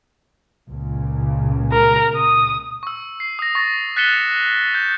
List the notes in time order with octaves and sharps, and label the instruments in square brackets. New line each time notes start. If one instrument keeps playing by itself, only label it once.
[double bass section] C#2 A#2 C#3
[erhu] A#4
D#6
[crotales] C#6 E6
C7
D#6 A#6
C#6 A6 A#6
F#6 A6 B6 C#7 E7 G7
G6